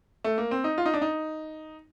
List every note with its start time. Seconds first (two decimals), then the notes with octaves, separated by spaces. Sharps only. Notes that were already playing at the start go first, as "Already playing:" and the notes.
0.24 A3
0.38 A#3
0.51 C4
0.64 D#4
0.78 F4
0.86 D#4
0.94 D4
1.02 D#4